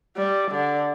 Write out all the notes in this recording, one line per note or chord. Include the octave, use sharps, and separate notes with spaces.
G3
D3